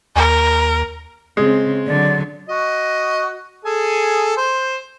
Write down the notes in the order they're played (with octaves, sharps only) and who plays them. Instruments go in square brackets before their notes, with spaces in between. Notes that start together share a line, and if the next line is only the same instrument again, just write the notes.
[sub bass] D#2 [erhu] A#4
[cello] C#3 C4 [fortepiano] G#3
[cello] D3 F#3 [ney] D5
[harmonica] F#4 D#5
G#4 A4 G#5
C5